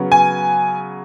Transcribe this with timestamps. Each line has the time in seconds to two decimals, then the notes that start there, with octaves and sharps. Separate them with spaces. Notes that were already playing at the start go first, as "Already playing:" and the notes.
Already playing: C#3 F#3 B3
0.12 G#5